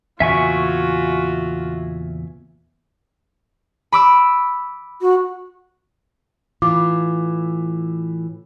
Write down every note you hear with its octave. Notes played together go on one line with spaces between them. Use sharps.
E2 A#2 C#3 F4 F#4 E5 G#5 C#6
B5 D6 E6
F#4
A2 E3 F4 D6